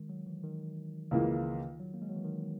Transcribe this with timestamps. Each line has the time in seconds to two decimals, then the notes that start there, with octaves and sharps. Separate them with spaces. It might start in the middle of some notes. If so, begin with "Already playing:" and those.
Already playing: D#3 G#3
0.09 F#3
0.27 E3
0.43 D#3
1.11 C#2 C#3 E3 A#3
1.79 F#3
1.94 A#3
2.02 G#3
2.09 F#3
2.17 E3
2.24 D#3